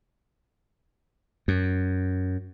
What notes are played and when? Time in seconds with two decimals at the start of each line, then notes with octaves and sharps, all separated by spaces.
1.48 F#2